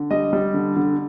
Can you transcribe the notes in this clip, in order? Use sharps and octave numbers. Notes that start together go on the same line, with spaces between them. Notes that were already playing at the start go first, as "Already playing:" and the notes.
Already playing: D3
G3 D#5
G3
D3
D3